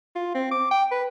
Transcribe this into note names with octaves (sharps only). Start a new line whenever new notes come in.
F4
C4
D6
G5
B4